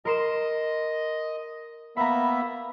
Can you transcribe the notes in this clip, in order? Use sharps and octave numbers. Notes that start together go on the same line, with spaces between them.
A#4 D#5 C6 E7
A#3 B3 E5 A#5 B5